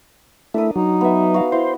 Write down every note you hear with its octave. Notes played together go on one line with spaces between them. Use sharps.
A3 D4 E4 A#4 D#6
F#3 D#4
B3 E5
F#4 F5
E4 C5